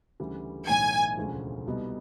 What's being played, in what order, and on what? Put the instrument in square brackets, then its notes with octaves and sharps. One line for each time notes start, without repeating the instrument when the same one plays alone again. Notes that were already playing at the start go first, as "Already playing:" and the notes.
[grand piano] D2 C#3 E3 G3
[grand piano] B1 A2 E3 [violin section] G#5
[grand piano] E1 D2 C#3 F3
C2 B2 G3 B3 D#4